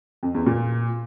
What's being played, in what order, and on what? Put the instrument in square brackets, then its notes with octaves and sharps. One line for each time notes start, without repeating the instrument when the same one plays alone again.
[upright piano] F2
E2
A#2